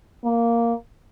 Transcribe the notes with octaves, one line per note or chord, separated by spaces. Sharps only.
A#3